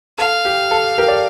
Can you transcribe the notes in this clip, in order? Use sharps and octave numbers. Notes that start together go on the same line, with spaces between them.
A4 F5
G4
A4
G4 A#4
D5